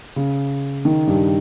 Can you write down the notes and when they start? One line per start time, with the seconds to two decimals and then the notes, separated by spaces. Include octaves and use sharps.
0.16 C#3
0.85 D#3
1.07 G2 G3